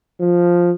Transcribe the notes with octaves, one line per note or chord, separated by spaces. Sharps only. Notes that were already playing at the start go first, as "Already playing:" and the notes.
F3